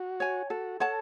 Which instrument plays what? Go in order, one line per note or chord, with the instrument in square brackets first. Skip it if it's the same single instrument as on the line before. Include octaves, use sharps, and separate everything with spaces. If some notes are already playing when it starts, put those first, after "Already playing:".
Already playing: [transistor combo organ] F#4
[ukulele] C#5 G#5
[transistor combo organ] F#4 [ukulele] A4
[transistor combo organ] A4 [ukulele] C#5 F#5 A5